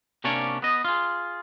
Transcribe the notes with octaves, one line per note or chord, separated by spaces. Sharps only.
C3 A#3 C#4 D4 C#5 D5
B3 D#5
F4 G#4